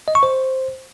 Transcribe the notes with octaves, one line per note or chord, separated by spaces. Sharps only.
D#5
C#6
C5